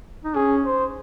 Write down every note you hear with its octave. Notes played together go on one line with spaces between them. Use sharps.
D#4
C#4 G#4
C5